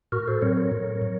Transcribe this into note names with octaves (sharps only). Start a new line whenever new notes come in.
A2 F#4 A#4
A4 C5
F#3 C4 A#4 C#5
A#4 C#5
A2
F#3